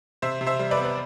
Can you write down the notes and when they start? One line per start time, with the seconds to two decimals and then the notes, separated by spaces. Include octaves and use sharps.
0.22 C3 C5 E5
0.41 C3
0.47 C5 E5
0.59 G3
0.71 B4 D5
0.77 B3
0.85 B4